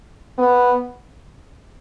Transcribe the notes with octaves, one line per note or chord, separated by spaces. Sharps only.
B3